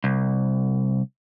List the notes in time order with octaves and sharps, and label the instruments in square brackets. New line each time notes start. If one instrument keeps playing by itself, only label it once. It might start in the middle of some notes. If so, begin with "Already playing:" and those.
[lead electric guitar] C2